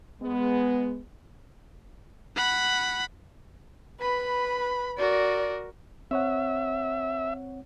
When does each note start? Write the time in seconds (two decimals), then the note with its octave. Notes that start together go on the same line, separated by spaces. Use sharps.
0.22 G#3 B3
2.36 F#5 B5
4.01 B4 B5
4.98 F#4 A#4 D5
6.11 C4 C#5 E5 F#5